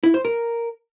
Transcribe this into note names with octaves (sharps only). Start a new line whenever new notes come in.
E4
C5
A#4